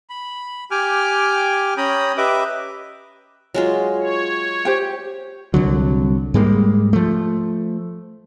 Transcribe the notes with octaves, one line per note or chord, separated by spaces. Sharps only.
B5
G4 G5 G#5 D6 F6
C#4 G5 A#5 B5 D#6
G4 B4 D#5 E5 D6
F#3 G#3 F4
C#5
G4 C5 G5
C2 D3 F#3
G#2 G3 G#3 A#3
F3 A3